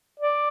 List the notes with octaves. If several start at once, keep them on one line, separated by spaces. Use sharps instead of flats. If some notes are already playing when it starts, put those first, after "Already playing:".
D5